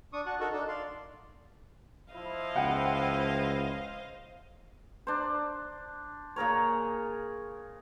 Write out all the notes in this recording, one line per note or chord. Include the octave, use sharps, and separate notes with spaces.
D4 C#6 D#6
F#4 A5 C#6 F#6
D#4 F#4 A4 A#4 C#6
D4 D#4 A4
D5 F5 C6
F3 E4 C5 D#5 F5
C#2 F#5 G5 B5
D4 C5
A#2 G#4 A#4 C#5